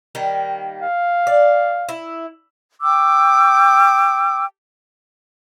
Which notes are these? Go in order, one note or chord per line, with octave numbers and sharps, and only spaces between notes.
D#3 G3 A#3
F5
D5
E4
G5 C#6 D6 E6